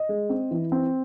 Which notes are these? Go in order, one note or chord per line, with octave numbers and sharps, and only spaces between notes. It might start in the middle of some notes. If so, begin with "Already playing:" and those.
Already playing: D#5
G#3
C4
E3
C4